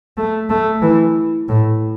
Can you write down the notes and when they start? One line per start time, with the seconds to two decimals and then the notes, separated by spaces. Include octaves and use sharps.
0.17 A3
0.50 A3
0.82 E3
1.49 A2